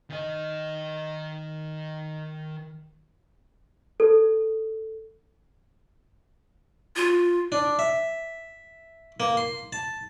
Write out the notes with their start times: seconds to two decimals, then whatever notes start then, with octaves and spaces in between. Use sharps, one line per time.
0.10 D#3 D#5
4.00 A4
6.96 F4
7.52 D4
7.79 E5
9.20 A#3
9.37 C6
9.73 A5